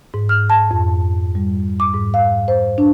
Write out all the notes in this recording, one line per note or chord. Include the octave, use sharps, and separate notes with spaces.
G#2
F6
A5
F2
G3
D6
G#2
F5
C5
D4